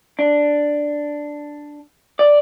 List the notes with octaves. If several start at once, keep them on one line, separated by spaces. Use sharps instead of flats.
D4
D5